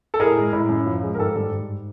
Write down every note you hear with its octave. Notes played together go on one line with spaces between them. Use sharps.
A4
A2 G#4 A#4
G#3
A2
F#2
F3
G#3
A#4
G#2 G4 A4
G3
G#2